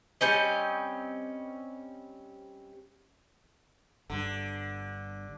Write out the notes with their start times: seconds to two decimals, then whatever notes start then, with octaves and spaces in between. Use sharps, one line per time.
0.21 G3 C4 C#4 D#5
4.10 G1 G2 D3